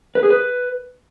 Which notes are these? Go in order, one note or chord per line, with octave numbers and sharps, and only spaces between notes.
B4
G#4
B4